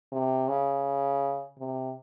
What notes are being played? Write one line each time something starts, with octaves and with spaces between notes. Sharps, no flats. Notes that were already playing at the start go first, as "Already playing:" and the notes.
C3
C#3
C3